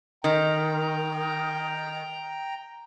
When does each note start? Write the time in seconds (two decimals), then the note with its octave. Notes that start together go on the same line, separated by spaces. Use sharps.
0.24 D#3 G5 A#5